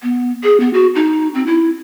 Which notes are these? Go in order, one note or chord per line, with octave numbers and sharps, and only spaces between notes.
B3
G#4
B3
F#4
D#4
C4
E4